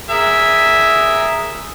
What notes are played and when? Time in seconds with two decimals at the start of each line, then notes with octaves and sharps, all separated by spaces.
0.10 G#4 A#4 E5